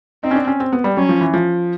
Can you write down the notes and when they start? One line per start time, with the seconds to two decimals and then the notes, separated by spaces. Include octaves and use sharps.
0.24 C4 D#4
0.31 C#4
0.36 D4
0.47 C#4
0.60 C4
0.72 B3
0.84 G3
0.97 F#3 C#4
1.09 F3
1.21 E3
1.34 F3